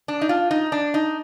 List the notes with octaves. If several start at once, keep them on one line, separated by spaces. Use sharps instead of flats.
D4
D#4
F4
D#4
D4
D#4